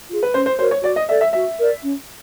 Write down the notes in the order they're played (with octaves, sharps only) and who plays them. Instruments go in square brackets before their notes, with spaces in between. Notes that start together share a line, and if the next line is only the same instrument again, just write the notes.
[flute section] F4 G#4
[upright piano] B4
[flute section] C#4 [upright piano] C5
[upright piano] C5
[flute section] F#4 A#4 C#5 [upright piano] C5
[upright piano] C#5
[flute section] F#4 [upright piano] D5
[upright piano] D#5
[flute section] A4 D5 [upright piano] E5
[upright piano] E5
[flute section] F#4 [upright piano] E5
[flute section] A#4 D5
C#4